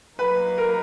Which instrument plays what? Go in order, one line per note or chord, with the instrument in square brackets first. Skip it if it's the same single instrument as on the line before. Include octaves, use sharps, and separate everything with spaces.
[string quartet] F#3 A#3 D#4 [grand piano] B4
[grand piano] A#4